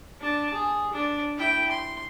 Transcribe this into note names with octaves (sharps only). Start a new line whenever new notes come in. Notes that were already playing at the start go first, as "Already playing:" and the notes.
D4 A5
G#4
D4
E4 G5
C6